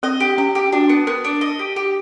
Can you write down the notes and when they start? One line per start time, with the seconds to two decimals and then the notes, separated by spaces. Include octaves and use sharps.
0.03 C4 D#5
0.20 G4
0.38 C#4 G4
0.55 G4
0.72 D4 F#4
0.90 B3
1.07 B3 A#4
1.25 D4
1.41 D#5
1.59 G4
1.76 G4